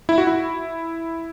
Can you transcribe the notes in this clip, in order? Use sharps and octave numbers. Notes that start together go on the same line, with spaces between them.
E4
F#4
E4